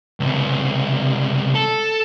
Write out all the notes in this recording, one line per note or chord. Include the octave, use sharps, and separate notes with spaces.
C#2 C3
A4